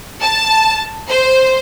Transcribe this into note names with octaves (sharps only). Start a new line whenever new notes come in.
A5
C5